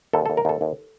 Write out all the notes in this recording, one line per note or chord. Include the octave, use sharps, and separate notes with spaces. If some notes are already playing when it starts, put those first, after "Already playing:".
D#2 A4
D#2 A4
A#4
D#2 A4
D#2